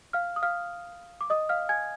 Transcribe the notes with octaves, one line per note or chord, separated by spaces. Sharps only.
F5 F6
D#6
F5 F6
D6
D#5 D#6
F5 F6
G#5 G#6